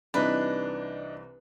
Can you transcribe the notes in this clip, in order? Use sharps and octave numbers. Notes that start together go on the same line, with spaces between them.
C2 C3 E3 D4 D#4 B4